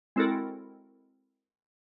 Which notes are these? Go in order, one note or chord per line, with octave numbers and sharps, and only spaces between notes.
G#3 C4 E4 F#4 A4 A#4